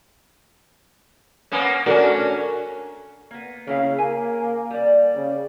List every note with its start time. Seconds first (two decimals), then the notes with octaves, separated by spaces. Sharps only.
1.52 A#3 B3 C#4
1.86 C#4 D4 F#4 A4 A#4
3.31 A#3 B3
3.67 C#3 A#3 E4 F5
3.98 A#3 G#5
4.70 G3 D5
5.15 C#3